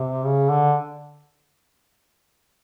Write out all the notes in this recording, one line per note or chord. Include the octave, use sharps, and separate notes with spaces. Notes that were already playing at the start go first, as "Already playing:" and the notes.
Already playing: C3
C#3
D3